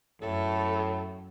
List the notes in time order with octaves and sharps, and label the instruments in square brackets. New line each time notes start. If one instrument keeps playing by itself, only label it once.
[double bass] F#2 [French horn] A2 [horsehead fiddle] A4